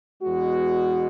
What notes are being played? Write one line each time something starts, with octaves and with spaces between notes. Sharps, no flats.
E2 B2 G#3 F#4